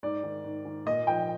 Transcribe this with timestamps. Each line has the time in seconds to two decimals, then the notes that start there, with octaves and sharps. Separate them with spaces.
0.03 G#2 D5
0.23 D#3
0.44 G#2
0.65 D#3
0.86 A#2 D#5
1.07 F3 G5